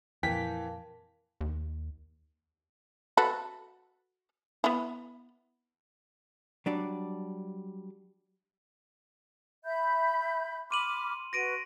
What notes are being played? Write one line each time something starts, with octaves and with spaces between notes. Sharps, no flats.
F2 A#2 E3 A#4 F5 G5 A5 B6
D#2
F#4 A4 B4
B3 E4
F#3 G3 D4 D5
E5 B5 G6
B5 C6 D6 F6 D#7 F#7
F#4 B4 A#6 D7 D#7